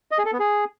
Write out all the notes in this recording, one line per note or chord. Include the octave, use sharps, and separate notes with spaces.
D#5
G#4
A4
B3
G#4